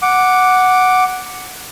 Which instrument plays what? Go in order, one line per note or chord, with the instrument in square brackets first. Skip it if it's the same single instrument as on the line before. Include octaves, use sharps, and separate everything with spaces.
[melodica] F#5 D6